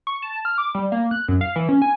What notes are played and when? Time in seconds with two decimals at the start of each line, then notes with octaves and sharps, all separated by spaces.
0.07 C#6
0.22 A5
0.45 F6
0.58 D6
0.75 G3
0.92 A#3
1.11 F#6
1.28 F#2
1.41 F5
1.56 E3
1.69 C#4
1.82 G#5